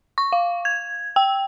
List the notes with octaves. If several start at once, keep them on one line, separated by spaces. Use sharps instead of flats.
C#6
F5
G#6
G5